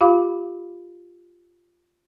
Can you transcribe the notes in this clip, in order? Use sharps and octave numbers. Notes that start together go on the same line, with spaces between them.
F4 G4 F5 B5 D6